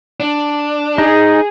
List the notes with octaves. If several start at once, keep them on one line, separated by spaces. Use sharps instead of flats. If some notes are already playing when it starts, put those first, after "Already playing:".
D4
D#4 G#4